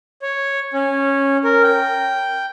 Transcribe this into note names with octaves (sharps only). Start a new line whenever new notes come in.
C#5
C#4
A#4
G5